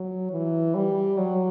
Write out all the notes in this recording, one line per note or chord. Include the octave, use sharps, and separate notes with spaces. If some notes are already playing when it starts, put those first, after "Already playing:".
Already playing: F#3
E3
G3
F#3